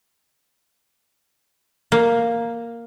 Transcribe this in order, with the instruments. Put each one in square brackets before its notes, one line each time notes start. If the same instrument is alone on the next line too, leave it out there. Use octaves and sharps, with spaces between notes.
[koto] A#3